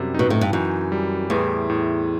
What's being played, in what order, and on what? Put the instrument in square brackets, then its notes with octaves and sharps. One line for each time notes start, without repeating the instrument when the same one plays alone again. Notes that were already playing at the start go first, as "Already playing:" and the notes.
Already playing: [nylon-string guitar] F#2 [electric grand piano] C3 G3
[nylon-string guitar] B2 [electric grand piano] D#4
[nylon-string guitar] A2
G2
[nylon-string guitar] F#2 [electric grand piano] E3
[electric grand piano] G3
[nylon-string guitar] E2 [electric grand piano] A2
[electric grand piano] A2